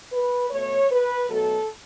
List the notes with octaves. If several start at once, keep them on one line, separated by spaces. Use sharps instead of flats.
B4
B2 A3 C#5
B4
B2 F#3 A3 A4